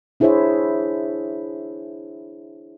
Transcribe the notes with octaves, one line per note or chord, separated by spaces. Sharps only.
D4 E4 G#4 C5 C#5 E5